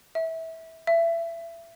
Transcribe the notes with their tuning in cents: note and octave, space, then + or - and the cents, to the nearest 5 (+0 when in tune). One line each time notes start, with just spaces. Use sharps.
E5 -20
E5 +25